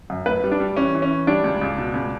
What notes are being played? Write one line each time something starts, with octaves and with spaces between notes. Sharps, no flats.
F#2
A2 B4
G3
D4
G3
E3 C#4
E3
C#4
E3
G3 D4
C#2
C#2
B2
C#2